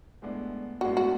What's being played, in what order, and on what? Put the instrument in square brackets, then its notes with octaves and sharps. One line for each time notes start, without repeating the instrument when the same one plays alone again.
[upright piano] A2 G#3 B3 D4
[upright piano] A2 G#3 B3 D4 [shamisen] F#4
[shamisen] F#4